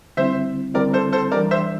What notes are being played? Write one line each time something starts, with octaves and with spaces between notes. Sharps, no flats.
D3 G3 C4 E4 C5 E5
D3 G3 C4 E4 A#4 D5
A4 C5
A4 C5
E3 G3 D4 A#4 D5
C5 E5